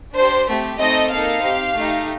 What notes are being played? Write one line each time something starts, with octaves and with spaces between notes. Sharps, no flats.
D4 G4 C5
A3 C4 G4
A3 C4 D#4 A4 D#5
A#3 D#4 A4 F5
C4 G4
A3 D#4 G4